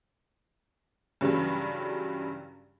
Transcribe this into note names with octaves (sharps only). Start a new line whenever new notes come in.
G2 C#3 E3 F#3 G3